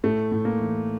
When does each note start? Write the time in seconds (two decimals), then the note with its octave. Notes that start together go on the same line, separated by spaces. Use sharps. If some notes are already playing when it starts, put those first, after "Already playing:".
0.04 A2 A3
0.32 A2
0.45 A#3
0.59 E3